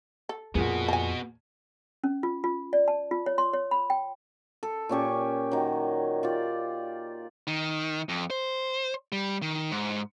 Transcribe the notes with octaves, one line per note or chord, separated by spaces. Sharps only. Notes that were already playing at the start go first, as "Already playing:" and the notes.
A4
F2 A#2 B3 F#4 G#4
G#5 A5
C#4
F4
F4
D5
A5
F4
C#5
C6
C#5
B5
G5
A4
A#2 C#4 G4 C#6
D#3 F#3
F4 G4 D5
D#3
F2
C5
G3
D#3
G#2